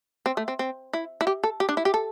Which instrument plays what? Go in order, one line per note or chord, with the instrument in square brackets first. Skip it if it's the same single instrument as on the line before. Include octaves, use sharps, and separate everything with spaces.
[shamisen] C4
A3
C4
C4
E4
E4
G4
A4
G4
D4
E4
G4
A4